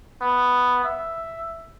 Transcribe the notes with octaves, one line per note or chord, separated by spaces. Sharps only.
B3
E5